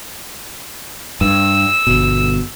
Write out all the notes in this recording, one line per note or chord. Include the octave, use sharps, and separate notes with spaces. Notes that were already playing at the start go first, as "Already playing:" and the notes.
G2 E6
G1 B2